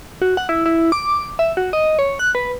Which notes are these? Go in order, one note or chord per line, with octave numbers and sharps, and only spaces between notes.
F#4
F#5
E4
E4
D6
E5
F#4
D#5
C#5
F#6
B4